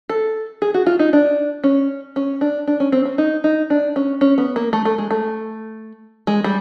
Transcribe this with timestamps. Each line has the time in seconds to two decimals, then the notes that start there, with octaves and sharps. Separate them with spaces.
0.09 A4
0.62 G#4
0.74 F#4
0.86 F4
0.99 D#4
1.13 D4
1.64 C#4
2.16 C#4
2.41 D4
2.67 D4
2.80 C#4
2.92 C4
3.05 C#4
3.18 D#4
3.44 D#4
3.70 D4
3.96 C#4
4.21 C#4
4.38 B3
4.56 A#3
4.73 A3
4.85 A3
4.98 G#3
5.11 A3
6.27 G#3
6.44 G3